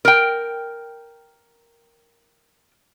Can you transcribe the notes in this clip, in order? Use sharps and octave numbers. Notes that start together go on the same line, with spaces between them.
A#4 G5